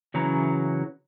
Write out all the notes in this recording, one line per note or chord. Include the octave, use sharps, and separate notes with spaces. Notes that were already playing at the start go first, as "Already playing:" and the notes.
C#3 E3 F#3 C#4 E4 A#5